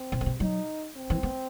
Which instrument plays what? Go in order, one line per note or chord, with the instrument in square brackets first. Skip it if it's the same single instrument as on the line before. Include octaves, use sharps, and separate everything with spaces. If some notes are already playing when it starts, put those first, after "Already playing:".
Already playing: [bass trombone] C4
[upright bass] B2
D#3
C3
[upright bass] F#3 [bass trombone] D#4
[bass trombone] C4
[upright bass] E3
B3